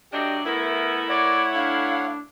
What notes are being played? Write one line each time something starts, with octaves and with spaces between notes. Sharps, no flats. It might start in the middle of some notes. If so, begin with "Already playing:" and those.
F#3 A3 D4 G4 D#5
A3 B3 E4 A#4
C#5 D5 F#5
D4 F5